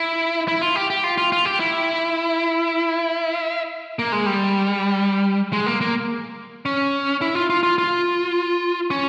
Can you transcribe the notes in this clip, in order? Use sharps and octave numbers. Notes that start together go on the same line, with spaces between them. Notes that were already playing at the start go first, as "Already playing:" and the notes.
Already playing: E4
E4
F4
G4
G4
F4
F4
F4
G4
E4
A#3
G#3
G3
G#3
A#3
A#3
C#4
E4
F4
F4
F4
F4
C#4